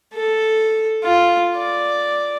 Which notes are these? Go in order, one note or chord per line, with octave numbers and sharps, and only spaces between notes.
A4
F4
D5